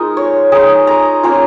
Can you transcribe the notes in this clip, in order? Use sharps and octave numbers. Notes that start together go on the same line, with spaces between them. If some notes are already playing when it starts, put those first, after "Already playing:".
Already playing: G#3 D#4 F4 A#4 G#5
C#5
G#3 D#4 G#4
A#5
A#3 C#4 F4